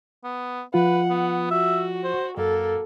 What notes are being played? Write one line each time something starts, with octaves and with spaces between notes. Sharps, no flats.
B3
F3 F4 B4 F#5
B3
F#4 E5
C5
F#2 A#3 A4